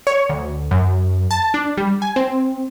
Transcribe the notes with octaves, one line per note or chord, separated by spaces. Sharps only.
C#5
D2
F#2
A5
D4
G3
G#5
C4